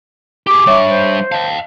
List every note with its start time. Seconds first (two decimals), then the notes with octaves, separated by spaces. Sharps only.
0.47 G4 G#4 D6
0.67 G3 D4 C#5 E5 C#6
0.89 C5
1.32 D#5 F5 A5